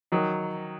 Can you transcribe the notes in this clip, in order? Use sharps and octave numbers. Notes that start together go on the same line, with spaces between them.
D#3 F#3 D#4